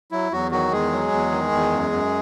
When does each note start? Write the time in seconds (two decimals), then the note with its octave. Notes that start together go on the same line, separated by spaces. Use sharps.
0.12 F#3 E4
0.32 E2 F#3 F#4
0.51 D#3 F#3 F#4
0.72 E2 G#3 G#4
0.92 F#3
1.12 E2
1.32 D#3
1.52 E2
1.72 F#2
1.92 F#2